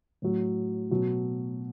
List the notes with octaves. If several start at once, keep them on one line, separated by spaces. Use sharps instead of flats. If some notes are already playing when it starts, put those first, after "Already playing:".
A2 F#3
B2 F#3